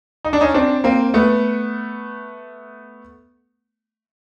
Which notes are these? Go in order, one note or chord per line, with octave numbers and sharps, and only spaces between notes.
D#4
D4
C#4 D#4
C4 D4
A#3 C4
A3 B3